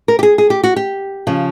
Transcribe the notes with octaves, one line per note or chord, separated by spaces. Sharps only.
A#4
G4
G#4
G#4
G4
F#4
G4
C#3 F3